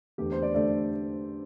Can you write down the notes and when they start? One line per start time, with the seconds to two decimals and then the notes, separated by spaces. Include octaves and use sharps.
0.18 E2 D3 A3 G4
0.32 C5
0.42 D5
0.55 D3 A3 D5